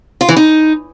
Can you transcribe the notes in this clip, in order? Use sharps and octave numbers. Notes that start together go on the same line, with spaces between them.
F4
E3
D#4